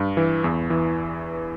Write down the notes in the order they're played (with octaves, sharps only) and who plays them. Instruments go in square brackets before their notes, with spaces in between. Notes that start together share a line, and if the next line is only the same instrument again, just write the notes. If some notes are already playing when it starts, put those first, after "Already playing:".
Already playing: [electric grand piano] G2
E3
E2
E3